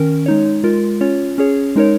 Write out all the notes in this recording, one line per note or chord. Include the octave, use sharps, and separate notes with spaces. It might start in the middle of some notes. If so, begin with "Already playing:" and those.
Already playing: D#3 C#4 A#4
G#3 D#4 C#5
G#3 F4 A#4
C#4 F4 C#5
C#4 G#4 C#5
G#3 D#4 A#4 C#5